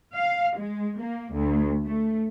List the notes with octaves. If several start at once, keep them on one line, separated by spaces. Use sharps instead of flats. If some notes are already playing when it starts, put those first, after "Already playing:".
F5
G#3
A#3
D2
A3